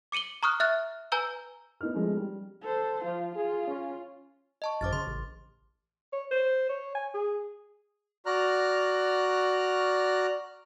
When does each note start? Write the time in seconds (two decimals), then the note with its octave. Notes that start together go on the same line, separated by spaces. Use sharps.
0.12 D6 C#7 D#7 F#7 G7
0.43 A#5 C#6 D#6 F6 F#6
0.60 E5 F6 F#6 A6
1.12 B4 G#5 A#5 E6 G6 G7
1.81 B3 D#4 F6
1.94 F3 G#3 A3 B3 C#4 D#4
2.17 G3
2.62 A4 C5
3.05 F3 F4
3.35 F4 G#4
3.67 C#4
4.62 D#5 A5 C#6
4.81 G#1 F#2 C5 D6 F6 A6
4.93 C#3 C6
5.07 A1
6.13 C#5
6.31 C5
6.69 C#5
6.95 G#5
7.14 G#4
8.26 F#4 D5 A#5 F6 F#6